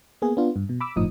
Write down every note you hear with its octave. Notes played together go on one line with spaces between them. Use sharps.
A#3 B3 G#4
B3 D4 F4
G2
B2
B5 D6 E6
G1 A2 F3 D#4 D#6